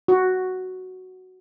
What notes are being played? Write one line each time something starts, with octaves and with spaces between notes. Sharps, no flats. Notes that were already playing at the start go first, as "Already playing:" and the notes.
F#4